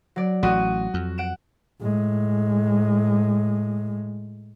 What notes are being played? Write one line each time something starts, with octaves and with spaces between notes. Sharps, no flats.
F#3 D5
A1 F#4 D#6 D#7
F2
F#5 D7 E7
A2 G#3